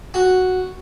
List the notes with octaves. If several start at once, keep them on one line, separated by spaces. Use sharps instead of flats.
F#4